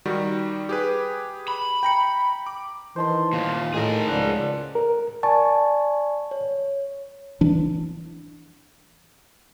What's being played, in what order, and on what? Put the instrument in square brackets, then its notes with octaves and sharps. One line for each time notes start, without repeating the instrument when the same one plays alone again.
[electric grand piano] D#3 G3 F#4
G4 G#4 B4
[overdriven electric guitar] B5
[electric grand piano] G5 A#5 C#7
D6
[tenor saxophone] D#3 [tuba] E3 [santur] C5 A5 C6
[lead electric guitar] D#2 A#2 [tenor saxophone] F4
[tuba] A2 [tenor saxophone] D#3 [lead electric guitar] G#4 A#4
[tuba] C#2 [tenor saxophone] F3 [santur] D5 F#5
[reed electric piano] A#4
[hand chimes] D5 G#5 C#6 [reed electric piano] A5
[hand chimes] C#5
[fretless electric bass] E3 D4